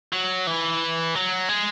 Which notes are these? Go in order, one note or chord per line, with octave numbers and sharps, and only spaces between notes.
F#3
E3
F#3
G#3